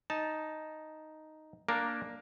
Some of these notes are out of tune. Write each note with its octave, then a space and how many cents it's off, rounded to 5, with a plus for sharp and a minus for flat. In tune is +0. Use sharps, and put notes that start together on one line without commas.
D#4 +0 A5 -5
A#3 +5 D4 +0 A#4 +0